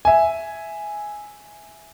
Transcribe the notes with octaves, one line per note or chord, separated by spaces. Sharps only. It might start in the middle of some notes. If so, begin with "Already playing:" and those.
E5 G#5